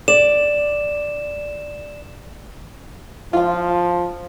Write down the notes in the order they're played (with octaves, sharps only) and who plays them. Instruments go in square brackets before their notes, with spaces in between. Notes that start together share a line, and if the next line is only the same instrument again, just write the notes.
[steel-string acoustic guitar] D5 [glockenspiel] E7
[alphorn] F3 [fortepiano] F4 F5